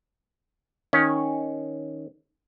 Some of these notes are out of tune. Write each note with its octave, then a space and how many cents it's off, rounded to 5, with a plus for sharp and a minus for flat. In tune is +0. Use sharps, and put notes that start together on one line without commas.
D#3 +5 C#4 -5